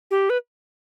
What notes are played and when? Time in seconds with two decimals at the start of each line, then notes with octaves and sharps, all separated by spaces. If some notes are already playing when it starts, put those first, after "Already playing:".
0.11 G4
0.30 B4